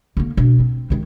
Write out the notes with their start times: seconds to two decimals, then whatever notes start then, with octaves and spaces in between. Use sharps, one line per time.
0.17 D3 A#3
0.37 B2 D4
0.60 C4
0.90 D#3 G#3